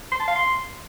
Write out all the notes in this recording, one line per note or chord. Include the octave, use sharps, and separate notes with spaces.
C6
A5
F5
C6